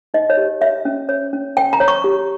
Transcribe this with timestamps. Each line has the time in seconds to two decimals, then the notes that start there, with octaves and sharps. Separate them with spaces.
0.14 D#4 D#5
0.30 C#5
0.37 G4
0.61 C#5 E5
0.85 C#4
1.09 C#5
1.33 C#4
1.57 C#5 G5
1.73 A#5
1.80 C#5
1.88 C#6
2.04 G4